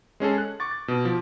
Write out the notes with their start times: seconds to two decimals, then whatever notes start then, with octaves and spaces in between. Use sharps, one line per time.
0.20 G#3 C#4 G#4 A4
0.38 F#6
0.60 C#6 D6 A6
0.71 A6
0.88 B2
1.05 F3